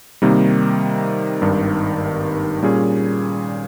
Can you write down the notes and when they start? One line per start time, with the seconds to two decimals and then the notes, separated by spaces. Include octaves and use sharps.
0.22 C3 D#3 G3 A#3 D#4
1.42 G#1 G2 D#3
2.63 A#2 G3 C#4 G#4